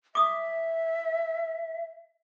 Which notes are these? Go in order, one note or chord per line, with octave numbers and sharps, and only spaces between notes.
E5 D6 D#6